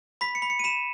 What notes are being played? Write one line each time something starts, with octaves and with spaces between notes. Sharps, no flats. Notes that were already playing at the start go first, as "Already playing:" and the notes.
B5 B6
C#7
B5
C#7
D#7
B5 E7